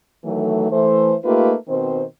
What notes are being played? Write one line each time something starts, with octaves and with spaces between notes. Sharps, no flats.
D#3 E3 F#3 A3
E3 A3 C5
A3 A#3 D#4 F4 G4 B4
B2 D#3 C4 C5